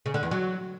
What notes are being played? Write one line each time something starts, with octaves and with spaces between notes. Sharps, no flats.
C#3
D3
E2
F#3